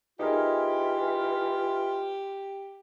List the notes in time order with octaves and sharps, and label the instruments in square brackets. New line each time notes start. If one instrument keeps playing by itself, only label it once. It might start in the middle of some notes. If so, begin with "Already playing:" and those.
[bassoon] E3 [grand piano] D#4 G#4 A#4 [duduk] F4 [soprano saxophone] G4